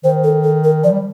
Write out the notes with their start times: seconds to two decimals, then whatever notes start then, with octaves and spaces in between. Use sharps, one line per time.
0.04 D#3 C5
0.24 A4
0.43 A4
0.64 A#4
0.84 F3 D5
0.91 G3